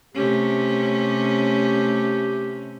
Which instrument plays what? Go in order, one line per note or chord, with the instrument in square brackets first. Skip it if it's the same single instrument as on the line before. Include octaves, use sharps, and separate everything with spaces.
[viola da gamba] C3 A3 C#4 [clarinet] G4